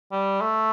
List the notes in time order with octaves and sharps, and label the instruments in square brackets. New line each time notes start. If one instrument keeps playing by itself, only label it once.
[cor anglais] G3
A3